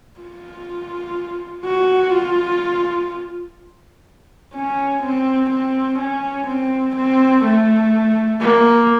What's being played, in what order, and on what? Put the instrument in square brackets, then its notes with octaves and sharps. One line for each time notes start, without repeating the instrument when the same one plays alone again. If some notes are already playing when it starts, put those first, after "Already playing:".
[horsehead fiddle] F4
F#4
F4
C#4
C4
C4
C#4
C4
C4
A3
A#3